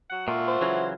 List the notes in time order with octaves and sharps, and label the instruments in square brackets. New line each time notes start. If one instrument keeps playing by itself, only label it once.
[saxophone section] F#3 F#4 F#5
[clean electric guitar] A#2 [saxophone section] F4 [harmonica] E5 F#5 C#6
[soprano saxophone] C5
[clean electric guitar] C#3 E3 F#3